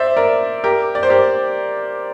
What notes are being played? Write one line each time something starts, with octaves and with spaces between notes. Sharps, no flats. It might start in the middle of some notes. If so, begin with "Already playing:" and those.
Already playing: C5 D5 E5
A#4 D5
G4 A#4
D5
C5
G4 A#4